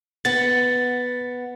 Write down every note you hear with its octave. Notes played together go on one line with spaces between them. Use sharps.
B3 F#5 A6